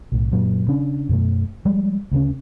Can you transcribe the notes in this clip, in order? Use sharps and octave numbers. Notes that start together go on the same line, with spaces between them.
B1 A2
F#2 A#2 F#3
C#3 C#4 D4
F#2 B2 A3
F3 G3 G#3
D2 C#3 C#4